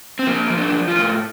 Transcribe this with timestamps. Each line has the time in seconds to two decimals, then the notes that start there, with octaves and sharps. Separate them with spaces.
0.19 C4
0.27 F3 A#3
0.50 F3
0.58 D4
0.72 F3
0.88 F4
0.95 A2